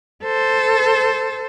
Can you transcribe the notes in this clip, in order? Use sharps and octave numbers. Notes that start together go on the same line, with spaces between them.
A4 C5